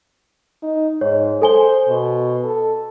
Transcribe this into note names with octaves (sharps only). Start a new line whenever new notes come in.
D#4
G#2 C#5
A4 C5 G#5 G7
B2
A4